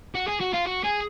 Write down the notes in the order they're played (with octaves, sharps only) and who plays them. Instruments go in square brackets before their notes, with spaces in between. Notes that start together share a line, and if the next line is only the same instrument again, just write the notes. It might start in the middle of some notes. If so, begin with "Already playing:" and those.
[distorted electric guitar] F#4
G#4
F#4
F4
F#4
G#4